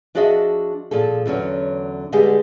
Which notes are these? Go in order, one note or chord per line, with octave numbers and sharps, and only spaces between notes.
F3 D4 F#4 G#4 D#5 E5
A#2 F3 G#4 A4
E2 D3 F#3 C#4
D3 G3 G#3 B3 G4 G#4